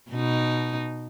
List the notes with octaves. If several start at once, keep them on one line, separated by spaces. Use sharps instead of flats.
B2 D#4